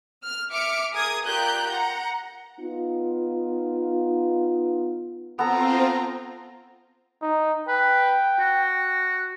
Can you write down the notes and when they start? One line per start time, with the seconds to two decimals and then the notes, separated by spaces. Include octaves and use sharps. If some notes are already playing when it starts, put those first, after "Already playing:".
0.23 F6
0.51 E5 D6 F6 C#7
0.93 G#4 A#4 D#6 G#6
1.25 F4 G4 A#4 D5 F#6 G6
1.69 F#5 A#5
2.60 B3 D#4 F4
5.39 B3 C4 F4 A4 A#5
7.22 D#4
7.68 B4 G5
8.40 F#4